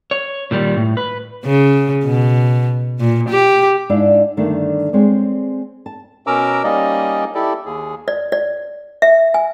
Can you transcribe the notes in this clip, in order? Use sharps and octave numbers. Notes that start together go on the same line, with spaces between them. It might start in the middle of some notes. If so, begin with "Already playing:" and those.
C#5
A#2 D#3 G3
A2
B4
C#3
B2
A#2
G4
G#2 D4 E4 D5 F5
G2 D3 D#3 A3 B3 D4
G#3 C4 C#5 D5
A5
B2 C#4 A#4 A#5 D6 E6
G3 A#3 C#4 D#4 D5 D#5
E4 G4 A4 D5
D#2 G#4
D5
D5
E5
G#5